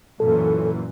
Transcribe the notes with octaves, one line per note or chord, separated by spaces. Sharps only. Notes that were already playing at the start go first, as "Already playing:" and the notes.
F#2 A#2 E3 A4